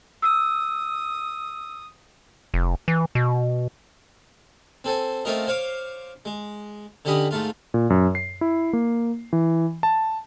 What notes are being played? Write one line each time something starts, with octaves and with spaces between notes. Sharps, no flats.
D#6 E6
F1
E3
B2
C4 A4 C5 G#5
A3 C4 C#4 F4 A#4 D#5
C5 C#5 F5 D6
G#3
D3 C#4 G4 D#5 B5 D#6
G#2 A3 F4
A#2
F#2
C7
E4
A#3
E3
A5